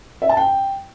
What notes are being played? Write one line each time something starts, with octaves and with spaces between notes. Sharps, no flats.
E5
A5
G5